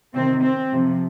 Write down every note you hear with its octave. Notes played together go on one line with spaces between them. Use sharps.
C3 D#3 C4
C4
C3 F3